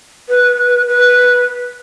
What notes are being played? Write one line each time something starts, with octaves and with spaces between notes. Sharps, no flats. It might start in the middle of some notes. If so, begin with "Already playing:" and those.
B4
B4